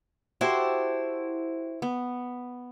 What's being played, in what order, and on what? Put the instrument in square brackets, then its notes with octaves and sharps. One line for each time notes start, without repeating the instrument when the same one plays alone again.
[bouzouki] E4 C5 G5 [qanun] F#4 G4 A4
[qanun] B3